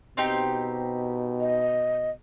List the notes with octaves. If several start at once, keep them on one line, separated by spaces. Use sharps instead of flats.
B2 C4 D#4 G4
D#5